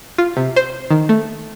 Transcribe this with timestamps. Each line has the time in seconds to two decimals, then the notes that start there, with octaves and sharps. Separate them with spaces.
0.18 F4
0.37 C3
0.56 C5
0.91 D#3
1.09 A3